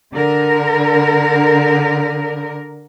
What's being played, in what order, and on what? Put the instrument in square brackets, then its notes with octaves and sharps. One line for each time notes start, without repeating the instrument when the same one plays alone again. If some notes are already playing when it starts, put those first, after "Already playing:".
[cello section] D3 A#4